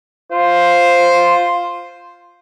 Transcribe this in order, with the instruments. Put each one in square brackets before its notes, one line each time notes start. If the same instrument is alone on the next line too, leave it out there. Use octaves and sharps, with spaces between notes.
[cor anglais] F4 [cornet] C5